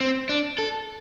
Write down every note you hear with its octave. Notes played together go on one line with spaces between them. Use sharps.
C4
D4
A4